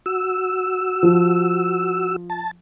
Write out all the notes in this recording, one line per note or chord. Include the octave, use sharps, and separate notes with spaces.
F#4 E6
F3
A5